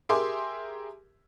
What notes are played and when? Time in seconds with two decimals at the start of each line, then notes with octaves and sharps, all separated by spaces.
0.09 G4 G#4 A#4 E5 C6 D6